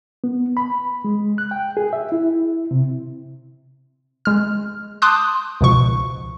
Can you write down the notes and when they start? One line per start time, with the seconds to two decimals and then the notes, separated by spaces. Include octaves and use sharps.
0.24 B3
0.57 B5
1.05 G#3
1.38 F#6
1.51 G5
1.77 G#4
1.93 E5
2.12 E4
2.71 C3
4.25 G#3 F6
5.02 A5 C6 D6 D#6 F#6 G6
5.61 C#2 G#2 B2 F3 C#6